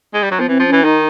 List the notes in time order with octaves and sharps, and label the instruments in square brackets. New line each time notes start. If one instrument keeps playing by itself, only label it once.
[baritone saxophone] G#3
G3
F#3
[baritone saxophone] F3 [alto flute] B3
[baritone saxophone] E3 [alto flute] C4
[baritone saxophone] F3
[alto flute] C#4
[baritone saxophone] E3
[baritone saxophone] D#3 [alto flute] D#4